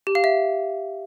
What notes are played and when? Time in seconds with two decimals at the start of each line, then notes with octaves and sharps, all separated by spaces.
0.07 G4
0.15 F5
0.24 E5